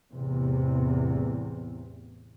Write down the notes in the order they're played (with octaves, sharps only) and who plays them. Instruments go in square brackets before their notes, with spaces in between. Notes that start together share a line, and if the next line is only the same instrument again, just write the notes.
[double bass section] A1 E2 C3